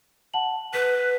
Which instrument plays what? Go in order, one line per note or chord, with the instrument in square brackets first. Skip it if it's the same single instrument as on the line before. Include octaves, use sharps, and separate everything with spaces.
[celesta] F#5 A5 F#7
[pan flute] B4 [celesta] B6